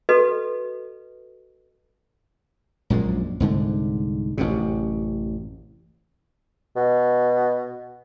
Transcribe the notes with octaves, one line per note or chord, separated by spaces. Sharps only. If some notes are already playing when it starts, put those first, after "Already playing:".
F#4 A4 B4 D#5
A#1 F#2 A#2 G#3
C2 G#2 D3
A1 F#2 C3
B2